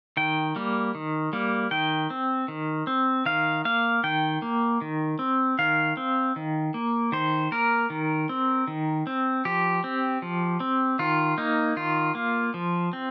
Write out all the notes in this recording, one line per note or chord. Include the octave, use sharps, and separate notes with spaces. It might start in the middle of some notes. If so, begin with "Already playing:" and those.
D#3 G5
G3 A#3
D#3
G3 A#3
D#3 G5
C4
D#3
C4
D#3 F5
A#3 F5
D#3 G5
A#3
D#3
C4
D#3 F5
C4
D#3
A#3
D#3 C5
A#3 A#4
D#3
C4
D#3
C4
F3 G4
C4
F3
C4
D#3 F4
A#3 D#4
D#3 F4
A#3
F3
C4